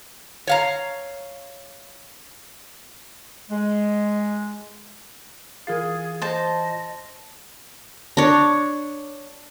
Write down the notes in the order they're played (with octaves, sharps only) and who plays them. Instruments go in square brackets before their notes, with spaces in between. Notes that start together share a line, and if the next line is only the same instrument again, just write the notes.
[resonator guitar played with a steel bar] C#5 F5 A#5
[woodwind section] G#3
[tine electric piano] E3 F4 A6 [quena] G#4 [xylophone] A#4 F5
[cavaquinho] C5 A5 [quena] D#5
[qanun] D4 C#5